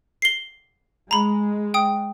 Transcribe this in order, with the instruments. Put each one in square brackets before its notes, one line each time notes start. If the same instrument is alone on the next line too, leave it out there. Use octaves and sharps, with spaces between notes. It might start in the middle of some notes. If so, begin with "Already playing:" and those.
[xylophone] C7 G7
[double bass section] G#3 [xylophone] A#5 B5
[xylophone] G5 D#6